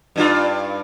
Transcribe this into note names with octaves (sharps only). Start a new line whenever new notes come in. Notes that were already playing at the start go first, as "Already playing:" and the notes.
G2 D4 F4